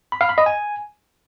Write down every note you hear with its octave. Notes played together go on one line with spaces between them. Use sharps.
B5
F5
B5
D#5
G#5